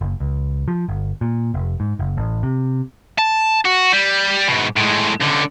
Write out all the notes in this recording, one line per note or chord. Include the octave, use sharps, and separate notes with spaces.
F#1
C#2
F3
G1
A#2
F1
G#2
F#1
A1
C3
A5
F#4
G3
G#2 B2
A2 G#3
C#2 D3